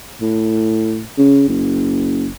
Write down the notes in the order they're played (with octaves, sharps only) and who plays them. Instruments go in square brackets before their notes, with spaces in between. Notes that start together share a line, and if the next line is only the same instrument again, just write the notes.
[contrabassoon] A2
C#3
F#1